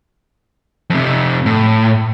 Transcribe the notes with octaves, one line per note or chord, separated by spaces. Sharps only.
F2 C3
A2